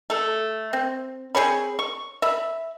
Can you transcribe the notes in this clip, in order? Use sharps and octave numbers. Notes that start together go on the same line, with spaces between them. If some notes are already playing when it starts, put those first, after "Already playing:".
A3 A4
C4
C4 G#4 C#5 B5
C#6
E5 B5